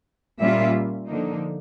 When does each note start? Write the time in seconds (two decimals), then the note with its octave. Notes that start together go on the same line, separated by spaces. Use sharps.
0.39 A#2 G3 A#3 C#4 F4 E5
1.09 D3 F3 A#3 D#4